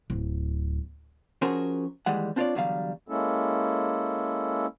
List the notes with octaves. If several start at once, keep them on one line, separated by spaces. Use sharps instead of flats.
D1
F3 C#4 F#4 G#4 A#4 C5
D#2 E3 G3 G#3 F#5
C4 D4 F4 A#4 C#5 D5
E2 D3 F#3 G3 F5
G#3 A#3 C#4 E4 A4